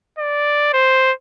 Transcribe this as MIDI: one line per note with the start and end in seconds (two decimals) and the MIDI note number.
0.19 0.72 74
0.73 1.12 72